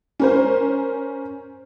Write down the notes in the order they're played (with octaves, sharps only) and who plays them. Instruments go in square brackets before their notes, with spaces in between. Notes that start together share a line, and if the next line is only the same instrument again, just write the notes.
[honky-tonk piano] C#4 A#4 C5